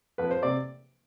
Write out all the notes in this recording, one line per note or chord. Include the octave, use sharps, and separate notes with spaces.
F2 B4
C5
C3 D5